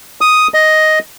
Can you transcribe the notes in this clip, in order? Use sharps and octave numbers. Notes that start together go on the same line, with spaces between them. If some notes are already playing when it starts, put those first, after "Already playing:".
D#6
D#5